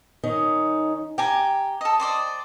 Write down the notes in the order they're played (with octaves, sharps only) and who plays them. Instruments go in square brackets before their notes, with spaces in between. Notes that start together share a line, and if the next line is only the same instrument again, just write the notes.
[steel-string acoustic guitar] D#3 C#4 D#4
[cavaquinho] G4 G#5 A#5 [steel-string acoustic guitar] G5
[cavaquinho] A4 D#5
C5 D5 D#5